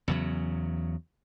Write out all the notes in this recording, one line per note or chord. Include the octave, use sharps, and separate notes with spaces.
E2 C#3 F#3